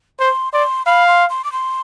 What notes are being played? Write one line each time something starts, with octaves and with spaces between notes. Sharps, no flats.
C5 C6
D5 C6
F5 B5
C6
C6
D6
C6